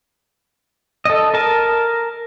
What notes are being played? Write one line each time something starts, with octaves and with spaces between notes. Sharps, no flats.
A4 D#5
A#4 A5